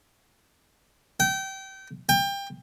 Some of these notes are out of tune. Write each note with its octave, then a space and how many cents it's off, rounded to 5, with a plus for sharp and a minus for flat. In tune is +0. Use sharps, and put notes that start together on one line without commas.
G5 -25
G5 +25